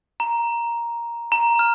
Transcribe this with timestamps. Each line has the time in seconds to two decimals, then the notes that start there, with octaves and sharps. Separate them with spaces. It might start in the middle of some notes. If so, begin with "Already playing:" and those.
0.20 A#5
1.32 A#5
1.59 F6